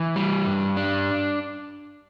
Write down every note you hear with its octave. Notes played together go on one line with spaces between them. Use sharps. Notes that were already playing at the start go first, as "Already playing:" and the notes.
Already playing: E3
G3
G2
D4